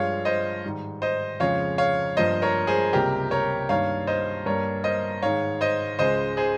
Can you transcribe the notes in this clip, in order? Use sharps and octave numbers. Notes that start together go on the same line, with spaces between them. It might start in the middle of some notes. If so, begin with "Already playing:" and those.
Already playing: G2 F3 G#3 C#5 F5
C5 D#5
G#2 D#3 G3
C5 D#5
F2 C#3 F3 G#3 C#5 F5
C#5 F5
G2 F3 A#3 C5 D#5
A#4 C#5
G#4 C5
C#2 C3 G3 A#3 G4 A#4
A#4 C#5
G2 D#3 A#3 C#5 F5
C5 D#5
G2 G3 A#3 A#4 C#5
C5 D#5
G#2 D#3 G#3 C#5 F5
C5 D#5
C#2 C#3 G#3 C5 D#5
G#4 C5